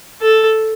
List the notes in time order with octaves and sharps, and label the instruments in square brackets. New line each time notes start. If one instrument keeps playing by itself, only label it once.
[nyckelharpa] A4